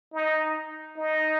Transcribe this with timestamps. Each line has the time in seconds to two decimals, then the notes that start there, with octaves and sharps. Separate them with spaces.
0.13 D#4
0.97 D#4